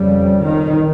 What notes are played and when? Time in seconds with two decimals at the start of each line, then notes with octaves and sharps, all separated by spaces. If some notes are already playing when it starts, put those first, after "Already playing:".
Already playing: F2 C#3 G3
0.41 D#3